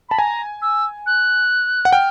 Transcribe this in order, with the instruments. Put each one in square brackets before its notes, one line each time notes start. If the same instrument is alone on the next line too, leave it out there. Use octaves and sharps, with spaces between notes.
[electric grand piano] A5 [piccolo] B5
[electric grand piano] G#5 [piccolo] A#5
[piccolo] E6
F#6
[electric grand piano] F#5
[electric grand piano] G5 [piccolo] F6